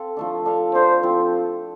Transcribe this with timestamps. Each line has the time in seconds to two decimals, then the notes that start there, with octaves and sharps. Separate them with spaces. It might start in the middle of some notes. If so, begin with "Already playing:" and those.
Already playing: C4 A4 F5
0.17 F3 A3 D4
0.45 D4 A4 F5
0.74 D4 A4 C5 F5
1.03 F3 C4 F4